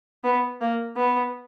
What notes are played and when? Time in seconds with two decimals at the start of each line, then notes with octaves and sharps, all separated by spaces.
0.24 B3
0.61 A#3
0.96 B3